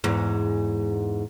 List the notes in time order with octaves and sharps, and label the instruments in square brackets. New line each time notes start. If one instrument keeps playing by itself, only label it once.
[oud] E2 G#2